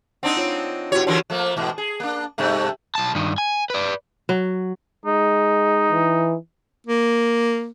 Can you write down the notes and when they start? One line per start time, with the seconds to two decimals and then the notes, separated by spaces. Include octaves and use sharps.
0.23 C4 D4 D#4 F#5
0.37 F4 C#5
0.92 B2 E4 F#4 G4 C#5
1.07 D3 E3 A#4 C#5
1.30 F3 A3 A#3
1.56 G#2 B2 E3
1.78 G#4
2.00 A#3 D4
2.38 G2 C3 A3
2.95 B1 A5
3.15 G2 D#3
3.38 G#5
3.70 B4 D5
4.29 F#3
5.06 G#3 D#4
5.92 E3
6.87 A#3